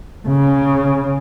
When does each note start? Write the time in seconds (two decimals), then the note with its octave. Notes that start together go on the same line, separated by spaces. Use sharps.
0.28 C#3